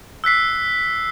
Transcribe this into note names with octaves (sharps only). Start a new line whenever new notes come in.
E6 F#6 B6 C7